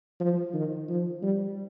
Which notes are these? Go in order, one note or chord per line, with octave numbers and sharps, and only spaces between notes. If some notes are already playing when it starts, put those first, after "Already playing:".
F3
D#3
F3
G3